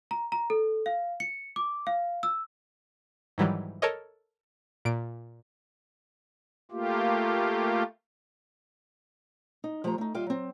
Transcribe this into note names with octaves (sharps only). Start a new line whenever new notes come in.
A#5
A#5
A4
F5
C#7
D6
F5
E6
G#2 D#3 E3 F#3 G3
A4 A#4 C#5 D#5
A#2 D7
A3 A#3 F4 G4
D#4
F3 A3 G4 C5 A#5
A3 D#4
D#2 G3 F4 E5 F5 G5
F#3 C4